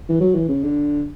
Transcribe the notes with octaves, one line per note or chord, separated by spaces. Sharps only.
E3
F#3
E3
C#3
D3